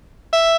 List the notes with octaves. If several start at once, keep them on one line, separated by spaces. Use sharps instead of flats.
E5